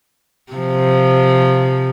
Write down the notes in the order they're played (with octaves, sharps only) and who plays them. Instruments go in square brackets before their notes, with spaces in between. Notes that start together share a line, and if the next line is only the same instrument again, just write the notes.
[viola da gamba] C3 F3